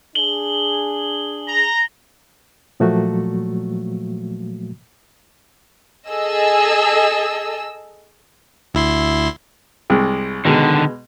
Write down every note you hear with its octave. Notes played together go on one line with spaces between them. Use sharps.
D4 G#4 F#7 G7
A#5
A#2 F3 F#3 A3 A#3 F#4
G#4 A4 D#5 E6
D2 E4 C6
C2 G#3
B2 D3 D#3 G#3